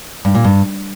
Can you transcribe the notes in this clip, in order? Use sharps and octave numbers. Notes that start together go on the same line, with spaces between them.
G2
A#2
G2